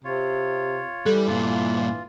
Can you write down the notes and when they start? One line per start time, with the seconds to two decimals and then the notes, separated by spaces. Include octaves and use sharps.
0.04 C3 F4 C#5
1.06 E3 G3 A4
1.27 G2 A#2 F4